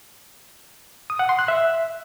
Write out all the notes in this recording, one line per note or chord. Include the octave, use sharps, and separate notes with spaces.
D#6
F#5
C6
F#6
E5